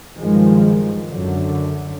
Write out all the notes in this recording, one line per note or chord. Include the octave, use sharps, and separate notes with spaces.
G2 D#3 F3 G#3
F#2 D3